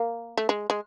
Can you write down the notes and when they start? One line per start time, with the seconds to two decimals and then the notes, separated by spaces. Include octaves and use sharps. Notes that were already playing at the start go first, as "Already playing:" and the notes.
Already playing: A#3
0.37 A3
0.49 G#3
0.70 G#3